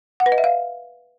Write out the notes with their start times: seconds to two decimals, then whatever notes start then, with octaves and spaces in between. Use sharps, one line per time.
0.20 F#5
0.26 B4
0.32 D#5
0.38 E5
0.44 F5